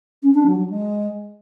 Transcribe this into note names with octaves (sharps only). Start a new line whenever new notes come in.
C#4
D4
F#3
F#3
G#3